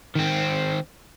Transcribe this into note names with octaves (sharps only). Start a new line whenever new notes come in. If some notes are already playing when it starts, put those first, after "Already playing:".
D#3 C4